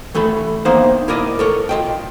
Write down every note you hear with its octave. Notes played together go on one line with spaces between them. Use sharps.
E3 A3 A4 B5
A#3 B3 D#4 C5 E5 F5
E4 A#4 D5 D#5
A4 A#4 C#5
F4 D#5 G5